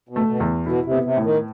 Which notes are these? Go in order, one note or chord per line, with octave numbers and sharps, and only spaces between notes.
B2
A3
B2
E2
B2 E4
C3
B3
C3
A2
D#3